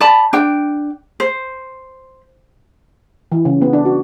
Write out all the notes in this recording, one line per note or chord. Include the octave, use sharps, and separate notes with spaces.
D5 A5 B5
D4 G5
C5
E3
C#3
B3
D4
F#4